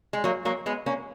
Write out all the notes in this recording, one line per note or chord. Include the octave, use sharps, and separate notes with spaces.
G#3
F#3 A#3
F#3 A#3
G#3 B3
A#3 C#4